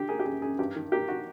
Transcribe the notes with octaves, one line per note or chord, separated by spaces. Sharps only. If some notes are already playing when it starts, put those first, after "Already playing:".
Already playing: D3 G4
A#3 G#4
G4
F#2 G#4
F#2 G#4
G2 G4
D#3
A#3 G4
F#4